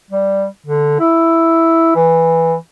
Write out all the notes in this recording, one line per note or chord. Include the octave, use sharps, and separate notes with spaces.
G3
D3
E4
E3